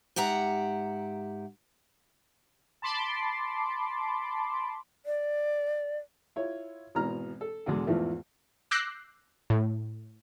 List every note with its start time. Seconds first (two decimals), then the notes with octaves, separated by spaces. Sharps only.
0.16 G#2 G4 E5 F#5 A#5
2.82 A5 B5 C6 D6
5.06 D5
6.36 E4 F4 C#5
6.95 G#1 B2 E3 A#5 F6
7.41 A4
7.66 E2 B2 D3 G#3
7.87 E2 G#2 E3 F3 A3
8.71 D6 E6 F#6 G6 A#6 C7
9.50 A2